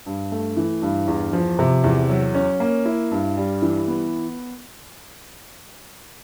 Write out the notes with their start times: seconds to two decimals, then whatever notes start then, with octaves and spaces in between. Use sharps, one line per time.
0.06 G2
0.32 A3
0.57 E3
0.82 G2
1.08 E2
1.33 F3
1.59 C3
1.84 E2
2.10 F#3
2.34 C#4
2.60 A#3
2.85 E4
3.11 G2
3.37 G3
3.62 E3
3.87 B3